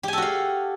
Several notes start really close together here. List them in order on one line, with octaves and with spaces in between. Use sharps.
G4 G#5 A4 F#4 F5